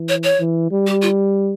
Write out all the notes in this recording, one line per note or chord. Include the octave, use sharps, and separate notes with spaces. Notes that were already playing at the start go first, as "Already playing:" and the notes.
Already playing: E3
C#5
C#5
E3
G3
G4
F4